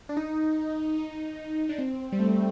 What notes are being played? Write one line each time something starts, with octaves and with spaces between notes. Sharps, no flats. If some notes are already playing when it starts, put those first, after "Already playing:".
D4
D#4
D#4
D4
C4
G3
A3